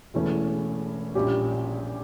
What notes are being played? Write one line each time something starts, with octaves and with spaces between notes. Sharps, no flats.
E1 E2 E3 A3 C#4
A#1 A#2 G3 C#4 G4